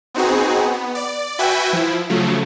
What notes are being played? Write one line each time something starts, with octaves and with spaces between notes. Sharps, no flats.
B3 C4 D#4 F#4 G#4
B3
D5
F#4 B4 E5 G5 G#5
F3 E4
C#3 F3 F#3 A3